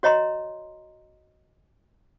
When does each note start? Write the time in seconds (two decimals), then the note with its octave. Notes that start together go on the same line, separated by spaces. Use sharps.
0.03 F#4 C#5 D#5 A#5 C6